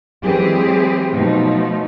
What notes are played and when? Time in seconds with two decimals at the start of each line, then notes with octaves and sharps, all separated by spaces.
0.22 E3 F#3 G#3 C4 G4 G#4
1.13 B2 F3 F#3 A3 D#4